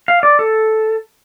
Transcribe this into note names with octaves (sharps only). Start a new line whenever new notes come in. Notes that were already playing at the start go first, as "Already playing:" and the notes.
F5
D5
A4